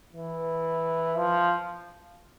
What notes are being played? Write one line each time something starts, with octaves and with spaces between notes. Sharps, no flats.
E3
F3